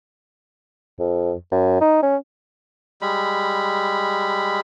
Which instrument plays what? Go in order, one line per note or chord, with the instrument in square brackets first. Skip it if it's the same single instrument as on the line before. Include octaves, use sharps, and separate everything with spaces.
[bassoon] F2
F#2
D#4
C#4
[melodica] G3 G#3 B5